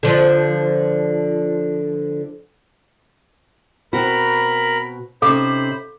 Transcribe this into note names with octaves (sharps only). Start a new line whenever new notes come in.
D3 F3
B2 C4 F#4 A#4 B5
C3 C#4 D#4 A4 C5 F5 B5 D6